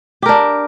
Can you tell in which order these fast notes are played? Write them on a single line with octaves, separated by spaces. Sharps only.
G4 A#4 D4